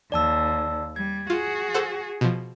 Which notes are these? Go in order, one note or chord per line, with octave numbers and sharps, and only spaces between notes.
D#2 D5 A5 E6
G3 G#6
F4 F#4 G#4
A4 C5 F#5
B2 F3